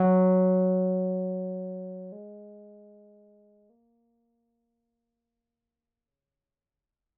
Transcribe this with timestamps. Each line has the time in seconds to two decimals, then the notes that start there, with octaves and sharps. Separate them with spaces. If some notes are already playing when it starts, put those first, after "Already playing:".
Already playing: F#3
2.12 G#3
3.70 A#3
6.08 C#3
6.87 B2